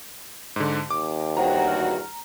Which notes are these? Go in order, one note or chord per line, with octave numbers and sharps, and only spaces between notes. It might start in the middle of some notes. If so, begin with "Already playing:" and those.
G#2 D3
D#2 D6
E2 G2 F#4 C5 F#5 G5 A#5
F6